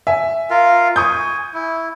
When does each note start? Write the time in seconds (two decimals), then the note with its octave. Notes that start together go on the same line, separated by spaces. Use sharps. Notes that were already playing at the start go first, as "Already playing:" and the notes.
0.07 E5 G#5
0.50 F4 A#4 F5
0.96 G#5 C#6 D#6 G6
1.54 E4